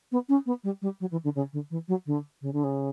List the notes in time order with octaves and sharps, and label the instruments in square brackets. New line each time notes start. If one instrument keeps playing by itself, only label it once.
[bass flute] B3
C#4
B3
G3
G3
F#3
E3
D3
C#3
D3
E3
F#3
D3
C#3
D3
C#3